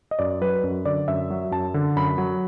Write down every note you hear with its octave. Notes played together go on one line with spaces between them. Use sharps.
D#5
F#2 D5
F#3 B4
F#2
D3 D5
F#2 E5
F#3
F#2 A5
D3
F#2 B5
F#3